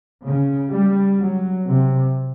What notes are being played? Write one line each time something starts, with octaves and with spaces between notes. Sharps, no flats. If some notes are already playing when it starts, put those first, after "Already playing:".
C#3
G3
F#3
C3